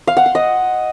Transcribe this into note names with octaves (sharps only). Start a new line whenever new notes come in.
F5
F#5
C6
D#5